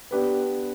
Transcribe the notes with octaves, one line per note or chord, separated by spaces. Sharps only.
B3 D4 G4 B4